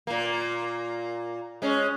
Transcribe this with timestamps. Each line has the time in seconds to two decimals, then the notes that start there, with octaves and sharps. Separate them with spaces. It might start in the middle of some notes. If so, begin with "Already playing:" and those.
0.07 A#2 A#3
1.62 G#3 C#4